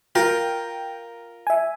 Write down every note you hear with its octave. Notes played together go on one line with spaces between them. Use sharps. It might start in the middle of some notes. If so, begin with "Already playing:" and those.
F4 A#4 G5
E5 G#5